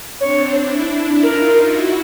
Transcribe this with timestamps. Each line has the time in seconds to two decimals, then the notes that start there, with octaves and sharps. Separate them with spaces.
0.20 C4 D4 C#5
0.54 D4 E4
0.89 D4 E4
1.23 D#4 F4 A#4
1.57 E4 F#4